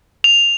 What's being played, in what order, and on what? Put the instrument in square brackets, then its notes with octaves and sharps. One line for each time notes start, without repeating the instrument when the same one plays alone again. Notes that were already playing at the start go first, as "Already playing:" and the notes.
[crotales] F7